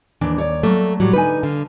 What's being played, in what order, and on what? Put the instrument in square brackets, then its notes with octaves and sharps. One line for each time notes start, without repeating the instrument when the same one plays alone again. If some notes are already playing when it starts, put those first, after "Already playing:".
[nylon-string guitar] D#2 [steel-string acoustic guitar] E3 D4
[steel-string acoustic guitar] C#5 D5
[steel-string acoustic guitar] F#3 A#3 [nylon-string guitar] A3
[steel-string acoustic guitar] A2 E3 G3 [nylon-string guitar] F#3
[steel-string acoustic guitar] D3 D#4 G#5 [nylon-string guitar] B4
[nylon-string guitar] D3 [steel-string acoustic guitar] F5